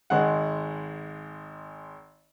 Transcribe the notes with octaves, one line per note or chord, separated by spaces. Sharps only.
G#1 G#3 F#5